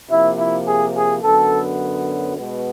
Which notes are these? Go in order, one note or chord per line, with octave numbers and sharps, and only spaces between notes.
C3 F3 A#3 E4
E4
G#4
G#4
F#2 D3 F#3 B3 A4
B2 G#3 B3